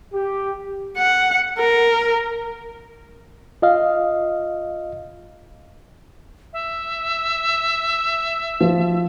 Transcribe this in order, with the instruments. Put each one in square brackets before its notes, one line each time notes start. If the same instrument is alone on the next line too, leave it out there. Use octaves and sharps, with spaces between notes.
[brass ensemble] G4
[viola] F#5
A#4
[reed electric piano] F4 D#5 F5
[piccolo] E5
[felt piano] F3